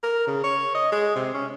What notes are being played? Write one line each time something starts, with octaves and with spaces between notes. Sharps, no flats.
A#4
C#3
C#5
D#5
G#3
C3
C#4